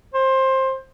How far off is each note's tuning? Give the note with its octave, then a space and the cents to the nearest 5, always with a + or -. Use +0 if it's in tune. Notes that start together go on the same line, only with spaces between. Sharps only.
C5 +20